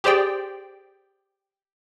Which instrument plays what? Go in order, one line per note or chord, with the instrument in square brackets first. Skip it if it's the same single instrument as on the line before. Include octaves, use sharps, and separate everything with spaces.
[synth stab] G4 G#4 C5 D5 G5